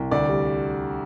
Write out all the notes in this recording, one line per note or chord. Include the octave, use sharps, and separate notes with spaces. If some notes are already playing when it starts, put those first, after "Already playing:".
Already playing: C2
D2 D5
G3